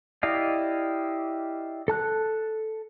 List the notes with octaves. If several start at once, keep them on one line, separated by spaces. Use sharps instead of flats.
E4 G4 D5 D#5 F5
A4 A5 F#6